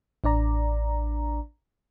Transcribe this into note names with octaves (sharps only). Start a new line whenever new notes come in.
A1 D4 D5 A#5